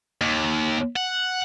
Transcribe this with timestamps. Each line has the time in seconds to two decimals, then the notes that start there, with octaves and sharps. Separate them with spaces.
0.21 D#2
0.96 F#5